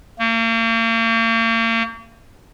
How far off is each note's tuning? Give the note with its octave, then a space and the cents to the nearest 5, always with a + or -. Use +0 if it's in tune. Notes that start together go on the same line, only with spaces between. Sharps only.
A#3 -40